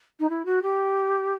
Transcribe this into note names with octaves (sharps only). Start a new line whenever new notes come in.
D#4
E4
F#4
G4